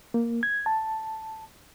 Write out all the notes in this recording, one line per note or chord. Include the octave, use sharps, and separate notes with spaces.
A#3
G#6
A5